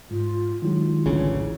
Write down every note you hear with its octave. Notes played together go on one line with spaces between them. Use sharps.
G#2 F4
D#3 F#3 G#3 E4 F4
A1 D2 C#3